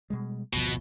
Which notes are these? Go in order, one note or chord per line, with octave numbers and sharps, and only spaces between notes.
B2 G3 G#3
G#1 D2 B2 F3